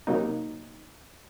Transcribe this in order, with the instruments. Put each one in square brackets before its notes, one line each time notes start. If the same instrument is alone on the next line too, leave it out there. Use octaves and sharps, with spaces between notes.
[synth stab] C3 F#3 A#3 D#4